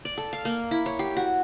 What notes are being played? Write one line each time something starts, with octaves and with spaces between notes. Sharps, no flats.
D5
A4
F5
A#3
E4
C#5
G4
F#4